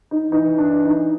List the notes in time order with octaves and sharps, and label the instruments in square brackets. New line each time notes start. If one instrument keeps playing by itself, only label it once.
[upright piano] D#4
[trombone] E3 [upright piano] D#4
[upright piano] D4
D#4